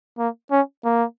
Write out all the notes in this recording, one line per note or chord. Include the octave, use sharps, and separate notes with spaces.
A#3
C#4
A#3